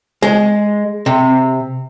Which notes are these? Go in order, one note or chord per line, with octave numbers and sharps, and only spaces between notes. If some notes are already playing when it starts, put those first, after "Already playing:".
G#3
C3